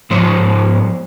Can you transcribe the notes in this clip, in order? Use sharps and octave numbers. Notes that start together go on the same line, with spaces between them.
G#2 F3 C5 C#5